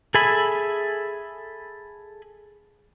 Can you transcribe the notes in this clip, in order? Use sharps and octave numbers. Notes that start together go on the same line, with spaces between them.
G#4 A4 E5 G#5 B5